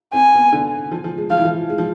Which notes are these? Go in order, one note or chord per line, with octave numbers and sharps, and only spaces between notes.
C4 G#5
B3
D3
F3
F3
G#3
F3 F5
E3
F3
G#3
F3